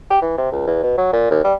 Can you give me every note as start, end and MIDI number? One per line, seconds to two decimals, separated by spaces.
0.11 0.18 67
0.22 0.34 52
0.38 0.51 48
0.52 0.66 37
0.67 0.83 40
0.83 0.95 47
0.98 1.11 54
1.13 1.26 46
1.31 1.40 39
1.44 1.54 55